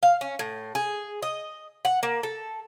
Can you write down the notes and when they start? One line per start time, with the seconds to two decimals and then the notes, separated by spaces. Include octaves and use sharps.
0.03 F5
0.21 C#4
0.39 A2
0.75 G#4
1.22 D#5
1.85 F#5
2.03 A#3
2.23 A4